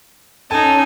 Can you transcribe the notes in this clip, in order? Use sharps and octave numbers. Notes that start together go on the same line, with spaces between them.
C#4 D#4 A4 G#5 A5